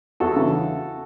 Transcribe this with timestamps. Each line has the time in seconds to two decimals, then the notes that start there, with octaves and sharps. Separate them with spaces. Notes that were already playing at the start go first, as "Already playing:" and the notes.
0.20 E2 F#4 A4
0.36 C#3 E3